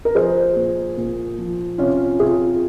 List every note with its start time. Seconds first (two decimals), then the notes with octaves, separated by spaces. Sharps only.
0.05 A#4
0.15 F3 G#4 C5
0.56 A#2
0.97 A#2
1.38 F3
1.78 C3 C#4 F4
2.19 C3 F4 G#4